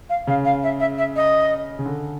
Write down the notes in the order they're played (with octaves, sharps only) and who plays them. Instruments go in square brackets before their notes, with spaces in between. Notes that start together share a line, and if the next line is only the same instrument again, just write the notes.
[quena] F5
[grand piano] C#3 [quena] F5
[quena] F5
E5
E5
E5
D#5
[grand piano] C#3
D3